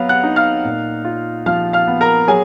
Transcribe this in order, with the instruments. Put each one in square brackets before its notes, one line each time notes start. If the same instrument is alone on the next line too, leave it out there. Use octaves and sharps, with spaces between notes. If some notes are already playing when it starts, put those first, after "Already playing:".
Already playing: [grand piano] F#3 B3 F5
F#5 F#6
D#4
F5 F6
A#2
F4
F3 F5 F6
F5 F6
B3
A#4 A#5
F#3 G#4 G#5